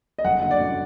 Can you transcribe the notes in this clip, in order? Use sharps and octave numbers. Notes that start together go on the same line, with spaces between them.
D#5
F#1 F#5
D3
D5
F#2